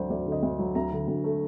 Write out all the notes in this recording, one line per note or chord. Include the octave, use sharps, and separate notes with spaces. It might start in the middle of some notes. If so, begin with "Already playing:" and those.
Already playing: D2 D3 F#3 C5 D5
D2 D5
D3
D#5
D2
F#3
D2 A#5
D3
D2
A3